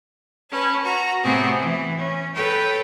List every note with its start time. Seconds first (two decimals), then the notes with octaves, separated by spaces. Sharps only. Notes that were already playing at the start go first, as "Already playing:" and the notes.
0.51 C#4 B4 A5
0.84 F#4 A#5
1.23 A2 C3 B3 C4 F#4 G#4
1.60 E3
1.97 C#4
2.35 A4 B4 C#5 G5